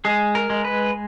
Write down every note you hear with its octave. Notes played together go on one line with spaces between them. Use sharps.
G#3 G#4
A#4
G#3
B4